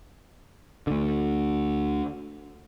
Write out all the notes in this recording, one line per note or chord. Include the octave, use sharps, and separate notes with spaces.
D2 D3